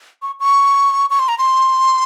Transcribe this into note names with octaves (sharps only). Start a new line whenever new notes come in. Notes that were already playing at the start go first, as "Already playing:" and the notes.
C#6
C#6
C#6
C6
A#5
C6